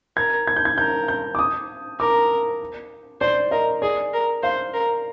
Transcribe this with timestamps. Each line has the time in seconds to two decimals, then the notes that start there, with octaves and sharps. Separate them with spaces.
0.17 A#4 G#6
0.47 G#6
0.56 G6
0.65 G#6
0.78 A#4 G6
1.08 G6
1.35 D6
1.39 D#6
1.99 A#4 D6
3.21 C5 D5
3.51 A#4 D#5
3.82 G#4 D5
4.13 A#4
4.43 C5 F5
4.74 A#4